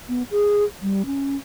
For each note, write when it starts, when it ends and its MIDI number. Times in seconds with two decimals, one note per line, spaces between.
0.09 0.23 59
0.31 0.64 68
0.82 1.02 55
1.06 1.36 61